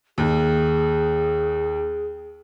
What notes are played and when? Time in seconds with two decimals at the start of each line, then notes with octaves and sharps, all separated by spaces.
0.18 D#2 G#4